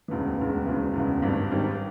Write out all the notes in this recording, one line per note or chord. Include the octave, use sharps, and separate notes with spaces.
E1 D2 C#3 E3
E1 D2 C#3 E3
E1 D2 C#3 E3
E1 D2 C#3 E3
G#1 G2 D#3 G3
G#1 G2 D#3 G3